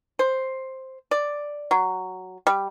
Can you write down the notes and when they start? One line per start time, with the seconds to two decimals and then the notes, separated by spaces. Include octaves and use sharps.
0.19 C5
1.11 D5
1.71 F#3
2.47 G3